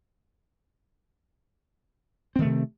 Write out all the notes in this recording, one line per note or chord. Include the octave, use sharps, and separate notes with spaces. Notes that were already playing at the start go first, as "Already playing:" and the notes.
C3 D#3 A3 C4